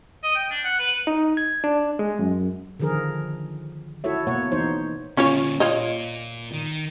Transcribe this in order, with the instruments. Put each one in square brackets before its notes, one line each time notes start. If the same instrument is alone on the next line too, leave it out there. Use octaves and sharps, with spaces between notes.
[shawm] D#5
G5
D4
F#5
B4
[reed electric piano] D#4
G#6
D4
G#3
F#2
[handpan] D3 D#3 F3 G#4 A#4
E4 F#4 A4 C#5 E5
B2 A#3 C#5 F#5
E3 A#3 D#4 C5 C#5
[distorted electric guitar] A#2 D3 [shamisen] C#4 F4 C#5
[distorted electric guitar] A#2 [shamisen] F4 C#5 D#5
[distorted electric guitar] D#3